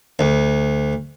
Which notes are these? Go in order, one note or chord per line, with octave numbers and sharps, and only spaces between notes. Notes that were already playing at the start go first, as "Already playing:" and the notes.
D2